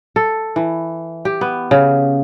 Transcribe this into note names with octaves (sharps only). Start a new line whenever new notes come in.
A4
E3
G4
B3
C#3